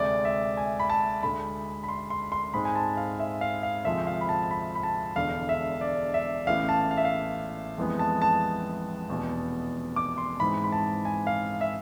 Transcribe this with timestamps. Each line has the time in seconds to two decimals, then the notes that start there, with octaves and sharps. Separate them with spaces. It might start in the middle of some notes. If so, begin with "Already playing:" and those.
Already playing: D2 C3 G#3 D5
0.25 E5
0.57 G#5
0.80 B5
0.90 A5
1.23 D2 D3 G#3 B5
1.83 B5
1.88 C6
2.10 C6
2.32 C6
2.54 G#2 G#3 C4 B5
2.65 G#5
2.75 A5
2.97 F5
3.19 E5
3.41 F5
3.63 F5
3.85 D2 C3 F3 G#3 E5
4.07 F5
4.21 B5
4.29 A5
4.51 B5
4.75 B5
4.83 A5
5.16 E1 E2 D3 F5
5.49 E5
5.81 D5
6.14 E5
6.47 A1 A2 E3 F5
6.69 A5
6.91 F5
6.97 E5
7.05 F5
7.78 F2 E3 G#3 B3
7.99 A5
8.22 A5
9.09 F1 E2 B2 B3
9.96 D6
10.18 C6
10.40 G#2 E3 G#3 C4 B5
10.64 B5
10.72 A5
11.05 G#5
11.27 F5
11.61 E5